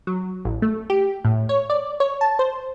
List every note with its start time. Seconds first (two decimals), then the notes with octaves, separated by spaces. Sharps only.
0.07 F#3
0.45 A1
0.62 A3
0.90 G4
1.25 A2
1.49 C#5
1.70 D5
2.00 C#5
2.21 A5
2.39 C5